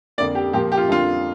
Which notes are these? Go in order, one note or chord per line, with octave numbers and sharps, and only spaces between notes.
F2 D3 A#3 D5
G4
A#2 F3 A#3 G4
G4
F4
F2 D3 G3 A#3 D4 F4